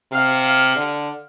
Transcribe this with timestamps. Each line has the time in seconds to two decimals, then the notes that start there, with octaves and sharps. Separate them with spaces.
0.12 C3 F5
0.45 F5
0.75 D3